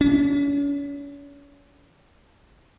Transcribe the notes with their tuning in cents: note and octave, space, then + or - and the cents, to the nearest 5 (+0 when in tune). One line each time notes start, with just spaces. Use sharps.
C#4 +40